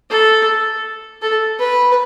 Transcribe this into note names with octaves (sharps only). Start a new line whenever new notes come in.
A4
A4
B4